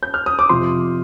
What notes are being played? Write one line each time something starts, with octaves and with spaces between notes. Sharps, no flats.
G6
F6
D#6
D6
F2 C3 F3 C6